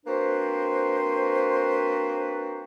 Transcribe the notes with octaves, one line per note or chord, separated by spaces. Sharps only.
A#3 C4 D4 F#4 B4 C5